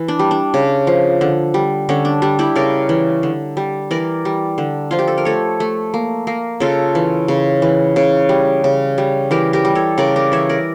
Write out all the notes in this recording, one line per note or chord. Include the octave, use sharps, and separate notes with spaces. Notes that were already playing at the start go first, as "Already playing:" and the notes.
Already playing: E3
D4
G3
D4
C#3
F3
D3
G3
D3 C#4
D4
G3 D4
E4 G4
C#3 A#4 D5
E3
D3
G3
E3 A#4 D5
G3
D3
F3 F4
G4
A4
A#4
A3 A4 C#5
A3
A#3
A#3
C#3 F4 A4
E3
C#3
E3
C#3
G3
C#3
G3
E3 G4 A#4
G4 A#4
G3
A4 C#5
C#3 A#4 D5
A#4 D5
E3 C#5 E5
A#4 D5